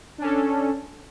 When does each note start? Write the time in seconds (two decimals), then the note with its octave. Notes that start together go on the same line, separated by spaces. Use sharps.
0.18 D4
0.21 C#4
0.24 A4